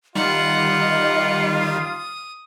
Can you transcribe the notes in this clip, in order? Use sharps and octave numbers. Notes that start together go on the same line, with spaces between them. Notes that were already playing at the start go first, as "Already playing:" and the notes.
D#3 G3 F4 D#5 F#5
D#6